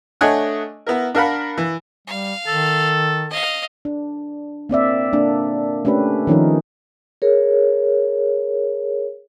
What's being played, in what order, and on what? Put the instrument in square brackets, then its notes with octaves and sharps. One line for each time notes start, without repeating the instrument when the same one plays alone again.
[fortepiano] A3 D4 C#5 D#5 F#5 G#5
B3 E4 A#4
D4 A#4 F5 F#5 B5
E3
[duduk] G3 [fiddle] F5
[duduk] D#3 [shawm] A4
[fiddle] D#5 F5
[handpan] D4
A#3 C4 D5 E5
A#3 D4
A3 C#4 D4 G4 B4
D#3 F3 C#4 D#4 A#4
[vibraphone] G#4 A#4 C#5